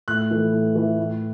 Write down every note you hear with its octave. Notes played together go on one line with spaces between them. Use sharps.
A2 F#6
E3 A3
A2
E3 A3
A2